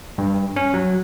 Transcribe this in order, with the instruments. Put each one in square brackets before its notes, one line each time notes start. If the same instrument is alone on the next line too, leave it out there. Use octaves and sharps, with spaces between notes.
[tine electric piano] G2
C#4
F#3